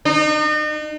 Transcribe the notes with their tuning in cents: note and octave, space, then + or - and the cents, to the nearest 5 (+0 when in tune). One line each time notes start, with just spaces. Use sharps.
D#4 -40